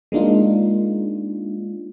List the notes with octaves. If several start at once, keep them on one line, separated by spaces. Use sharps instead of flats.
G#3 A#3 D4 D#4 F4